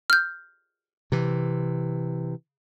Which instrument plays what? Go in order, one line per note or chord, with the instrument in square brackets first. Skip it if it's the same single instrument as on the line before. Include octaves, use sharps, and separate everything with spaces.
[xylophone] F6 G6
[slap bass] C3 E3